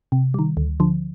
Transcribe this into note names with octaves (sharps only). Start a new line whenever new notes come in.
C3
D#3 G3
D2
D3 F3